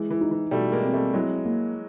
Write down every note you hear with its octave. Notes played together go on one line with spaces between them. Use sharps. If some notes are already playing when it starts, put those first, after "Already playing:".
Already playing: E3 G#3
E3
D#4
E3
B2 G3 A3
G#3 A#3
C4
G3 A3
F#3 G#3 E4
A#3